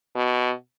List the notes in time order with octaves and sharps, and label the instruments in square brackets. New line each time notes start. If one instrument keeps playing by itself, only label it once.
[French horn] B2